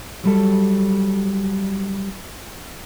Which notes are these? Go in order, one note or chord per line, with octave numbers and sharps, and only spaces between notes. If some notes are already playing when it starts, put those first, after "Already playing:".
F#3 G3 A4